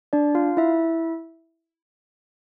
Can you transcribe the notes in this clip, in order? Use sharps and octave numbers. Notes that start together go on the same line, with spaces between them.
D4 D5
F4 F5
E4 E5